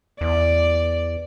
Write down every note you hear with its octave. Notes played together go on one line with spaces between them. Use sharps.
E2 D5